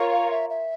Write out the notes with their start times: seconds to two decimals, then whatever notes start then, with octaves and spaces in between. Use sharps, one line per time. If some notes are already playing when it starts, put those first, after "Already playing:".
Already playing: F4 A#4 C#5
0.12 F5
0.31 E5
0.50 E5